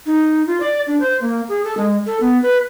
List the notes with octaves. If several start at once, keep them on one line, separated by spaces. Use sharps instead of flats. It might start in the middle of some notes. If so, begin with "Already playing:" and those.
D#4
F4
D5
D4
C5
A#3
G#4
A4
G#3
A4
B3
B4